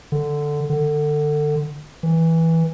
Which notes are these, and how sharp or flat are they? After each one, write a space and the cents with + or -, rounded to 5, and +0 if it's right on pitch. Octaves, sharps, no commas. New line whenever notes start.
D3 +5
D3 +25
E3 -10